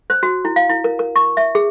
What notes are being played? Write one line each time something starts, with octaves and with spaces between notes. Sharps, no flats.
C5
F#4
E4
F5
E4
A#4
A#4
C#6
E5
G#4